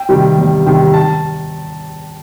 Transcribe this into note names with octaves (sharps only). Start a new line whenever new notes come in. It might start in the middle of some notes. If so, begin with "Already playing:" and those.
Already playing: G5
C3 D#3 G3
E2
C3 D#3 G3
A5